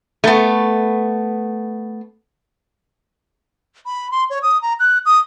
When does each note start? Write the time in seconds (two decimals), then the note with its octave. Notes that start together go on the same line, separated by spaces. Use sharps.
0.24 A3 B3
3.86 B5
4.12 C6
4.30 C#5
4.43 D#6
4.62 A#5
4.80 F#6
5.06 D#6